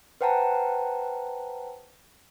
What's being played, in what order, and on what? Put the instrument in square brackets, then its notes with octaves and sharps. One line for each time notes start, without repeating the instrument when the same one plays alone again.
[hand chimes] B4 C5 F#5 G5 A5 A#5